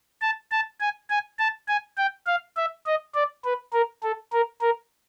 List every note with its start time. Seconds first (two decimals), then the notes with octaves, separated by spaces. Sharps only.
0.22 A5
0.52 A5
0.80 G#5
1.10 G#5
1.39 A5
1.68 G#5
1.98 G5
2.27 F5
2.57 E5
2.86 D#5
3.15 D5
3.44 B4
3.73 A#4
4.03 A4
4.33 A#4
4.62 A#4